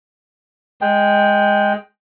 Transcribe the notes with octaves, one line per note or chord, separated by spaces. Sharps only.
G#3 G5